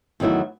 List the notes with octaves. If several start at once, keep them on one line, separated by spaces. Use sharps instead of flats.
E2 D#3 F#3 A3 E4